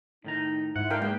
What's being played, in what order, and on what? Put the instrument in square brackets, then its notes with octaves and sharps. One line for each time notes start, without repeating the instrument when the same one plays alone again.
[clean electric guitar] A2 D#3 A#5 [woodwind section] D#4
[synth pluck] G#2 [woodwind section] E4 F4 [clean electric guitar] F#5
[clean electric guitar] D4 [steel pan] A#4 F5 G5
[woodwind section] E2 G#4 B4 [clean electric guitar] G#3 A#3 [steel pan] G5